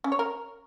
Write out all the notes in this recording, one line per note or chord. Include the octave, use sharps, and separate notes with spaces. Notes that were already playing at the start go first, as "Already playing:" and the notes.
C#4
C#5
A#4